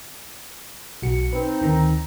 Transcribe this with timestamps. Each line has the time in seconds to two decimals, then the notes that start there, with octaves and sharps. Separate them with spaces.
1.02 B1 F#4 C#7
1.33 C4 D#4 B4
1.61 D2 D#3 A#5